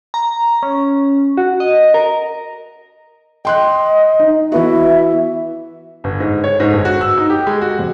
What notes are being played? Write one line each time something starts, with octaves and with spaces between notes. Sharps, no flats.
A#5
C#4
F#4
D#5
A#4
D#5 G5 C6 F#6
D#4
E3 B3 F#4 E5
G1
G#2
C#5
G#2
G1
F#4
E6
D#4
G4
G#3
F#4
F2